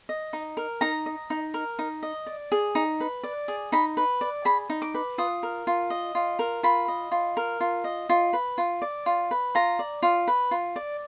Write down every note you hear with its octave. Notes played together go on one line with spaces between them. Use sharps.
D#5
D#4
A#4
D#4 A#5
D#5
D#4
A#4
D#4
D#5
D5
G#4
D#4
B4
D5
G#4
D#4 B5
B4
D5
G#4 B5
D#4
D6
B4
F4 D#6
A#4
F4
D#5
F4
A#4
F4 B5
D#5
F4
A#4
F4
D#5
F4
B4
F4
D5
F4
B4
F4 A#5
D5
F4
B4
F4
D5